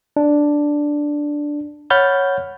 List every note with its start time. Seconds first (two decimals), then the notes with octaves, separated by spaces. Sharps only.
0.16 D4
1.90 C#5 F#5 B5 F6 G6 A6